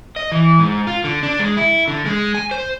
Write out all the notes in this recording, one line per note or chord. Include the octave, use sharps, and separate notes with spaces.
D#5
E3
G#2
F4
D3
D4
G#3
E4
D3
G#3
G#5
C5